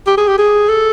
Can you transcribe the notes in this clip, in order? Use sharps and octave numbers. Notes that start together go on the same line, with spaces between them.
G4
G#4
G4
G#4
A4